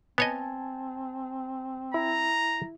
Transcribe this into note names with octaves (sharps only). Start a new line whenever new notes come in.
B3 C4 C#5 D#5 G#5 A5
E4 A#5